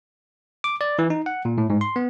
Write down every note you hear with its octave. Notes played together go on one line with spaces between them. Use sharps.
D6
D5
E3
D#4
F#5
A#2
A2
G#2
C6
B3